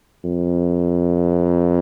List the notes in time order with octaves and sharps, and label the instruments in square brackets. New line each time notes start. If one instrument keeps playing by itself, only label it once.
[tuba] F2